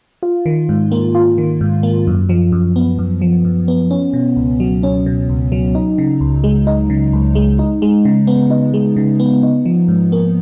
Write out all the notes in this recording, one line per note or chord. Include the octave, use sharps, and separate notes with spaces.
F4
D#3
G#2
A#3
F4
D#3
G#2
A#3
F#2
F3
F#2
B3
F#2
F3
F#2
B3
C#4
B2
C#2
F#3
C#4
B2
C#2
F#3
D#4
C#3
C#2
G#3
D#4
C#3
C#2
G#3
D#4
G#3
C#3
B3
D#4
G#3
C#3
B3
D#4
F3
G#2
A#3